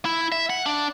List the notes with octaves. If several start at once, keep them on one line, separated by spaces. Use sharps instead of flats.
E4
E5
F#5
D4